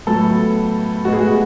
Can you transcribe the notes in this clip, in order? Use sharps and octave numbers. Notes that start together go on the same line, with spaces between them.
A2 F#3 B3 A4
A2 G#3 B3 F#4
G#4
F#4